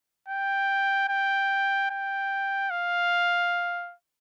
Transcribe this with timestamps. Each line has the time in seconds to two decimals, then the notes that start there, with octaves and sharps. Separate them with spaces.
0.28 G5
1.09 G5
1.90 G5
2.70 F5